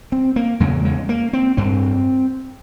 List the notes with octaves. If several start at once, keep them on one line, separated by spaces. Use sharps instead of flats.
C4
A#3
E2 C#3 G#3
G#3
A#3
C4
G2 C4